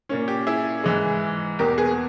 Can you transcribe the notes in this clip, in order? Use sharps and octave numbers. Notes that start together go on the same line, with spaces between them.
A#2 A#3 C#4
G4
E4 G#4
G#2 E3 G#3
E2 B2 A#3 G4 A#4
G#4 B4